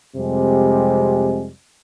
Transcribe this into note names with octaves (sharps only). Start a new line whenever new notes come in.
F2 C3 G3 G#3